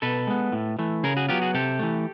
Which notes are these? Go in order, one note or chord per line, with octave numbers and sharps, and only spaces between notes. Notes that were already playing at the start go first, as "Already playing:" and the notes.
B2 A4 B4
G#3 B3
A2
E3 A3
C#3 G#4 A#4
F#4 G#4
F#3 B3 F4 G4
F#4 G#4
C3 G4 A4
E3 A3